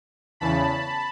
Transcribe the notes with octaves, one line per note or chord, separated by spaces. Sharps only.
E2 C#3 E3 A5 B5